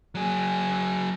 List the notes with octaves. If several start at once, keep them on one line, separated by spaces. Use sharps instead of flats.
F#3 G#4